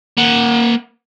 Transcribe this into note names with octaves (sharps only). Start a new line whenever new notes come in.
A#3 F#5